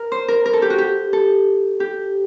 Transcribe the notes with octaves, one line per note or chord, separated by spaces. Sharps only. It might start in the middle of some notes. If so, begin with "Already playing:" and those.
Already playing: A#4
C5
A#4
A#4
A4
G4
F#4
G4
A4
G4